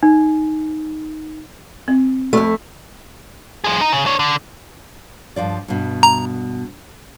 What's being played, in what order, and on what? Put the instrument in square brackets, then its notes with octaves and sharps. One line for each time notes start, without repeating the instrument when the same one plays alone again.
[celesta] D#4
[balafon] C4
[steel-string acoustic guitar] F2 A3
[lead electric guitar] F3 G#4
D#4
C#3
D4 C#5
D3
[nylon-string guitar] G2 F3 D5
G2 B2
[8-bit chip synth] A#5